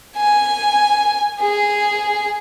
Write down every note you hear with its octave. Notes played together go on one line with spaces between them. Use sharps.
G#5
G#4